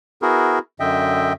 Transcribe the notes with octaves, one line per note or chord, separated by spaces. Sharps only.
B3 E4 F#4 G#4 A#4
F#2 D3 D#5 E5 G5